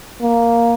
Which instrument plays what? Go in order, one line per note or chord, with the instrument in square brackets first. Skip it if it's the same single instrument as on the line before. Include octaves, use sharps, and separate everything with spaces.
[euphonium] A#3